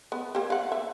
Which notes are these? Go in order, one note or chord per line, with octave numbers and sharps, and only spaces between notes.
B3
A#3 G4
F5 F#5
E5